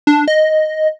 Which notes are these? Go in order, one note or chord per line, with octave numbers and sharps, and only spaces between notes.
D4
D#5